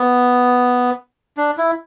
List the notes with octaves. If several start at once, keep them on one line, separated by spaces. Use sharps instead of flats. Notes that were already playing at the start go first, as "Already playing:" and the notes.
Already playing: B3
D4
E4